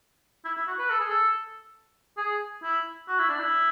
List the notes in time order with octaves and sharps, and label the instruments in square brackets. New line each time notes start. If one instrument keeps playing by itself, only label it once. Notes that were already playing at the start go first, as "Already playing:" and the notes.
[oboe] E4
E4
F#4
B4
A4
G#4
A4
G#4
E4
F#4
E4
D4
E4